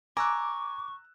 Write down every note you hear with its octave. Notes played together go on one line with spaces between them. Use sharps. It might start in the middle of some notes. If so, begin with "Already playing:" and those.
G#5 A#5 C#6 D6 E6 F#6